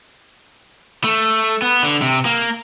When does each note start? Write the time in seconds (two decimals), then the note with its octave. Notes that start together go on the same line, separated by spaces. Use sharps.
1.04 A3
1.62 B3
1.83 D3
2.02 C3
2.25 A#3